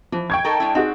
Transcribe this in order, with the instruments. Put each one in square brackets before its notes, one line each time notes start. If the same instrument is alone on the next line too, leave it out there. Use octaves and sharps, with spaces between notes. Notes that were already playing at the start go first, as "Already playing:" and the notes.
[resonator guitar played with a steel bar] E3 [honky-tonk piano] F3
[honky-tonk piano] G5 C#6 G#6
[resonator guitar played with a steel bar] D#4 A4 A#4
G#3 D4 E4
[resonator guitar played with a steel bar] C4 [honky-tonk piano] D#4 F#4 G#4